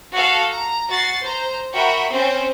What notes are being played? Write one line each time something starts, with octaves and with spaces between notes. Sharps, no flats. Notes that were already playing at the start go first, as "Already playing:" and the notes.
F#4 A4 F5 F#5
A#5
F#4 A6 C7
C5 A#5
F#4 A#4 E5 G5 B5
C4 C#4 C5